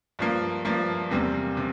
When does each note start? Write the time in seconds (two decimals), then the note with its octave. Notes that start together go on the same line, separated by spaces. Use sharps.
0.19 G2 F3 A#3
0.65 G2 F3 A#3
1.10 E2 C3 G3 A#3
1.57 C3